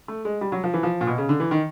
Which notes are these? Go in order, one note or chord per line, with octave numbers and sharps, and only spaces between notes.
A3
G#3
G3
F#3
F3
E3
F3
A#2
B2
C#3
D3
E3
D#3